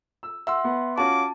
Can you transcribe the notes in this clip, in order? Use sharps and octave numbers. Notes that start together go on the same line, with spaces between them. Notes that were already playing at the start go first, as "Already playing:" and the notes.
E6
E5 F#5 C6 E6
B3
C#4 F4 F#4 A5 D6